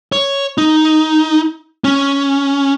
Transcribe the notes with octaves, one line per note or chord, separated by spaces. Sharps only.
C#5
D#4
C#4